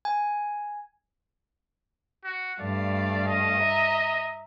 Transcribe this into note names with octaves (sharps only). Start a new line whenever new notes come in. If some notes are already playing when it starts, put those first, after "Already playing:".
G#5
F#4
G2 A3 D5 F5
D#5
E5 A#5